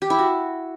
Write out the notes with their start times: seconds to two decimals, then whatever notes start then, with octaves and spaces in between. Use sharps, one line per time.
0.02 G4
0.10 E4
0.19 F#4